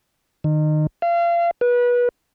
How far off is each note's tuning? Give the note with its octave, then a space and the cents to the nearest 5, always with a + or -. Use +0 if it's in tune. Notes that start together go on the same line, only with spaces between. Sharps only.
D#3 -25
F5 -30
B4 -25